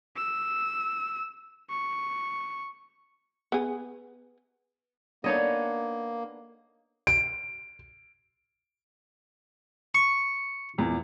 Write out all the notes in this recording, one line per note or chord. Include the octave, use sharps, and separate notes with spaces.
E6
C#6
B3 G#4
A#3 B3 D4 D#4 A4 C#5 D#5
D7
C#6
E2 A#2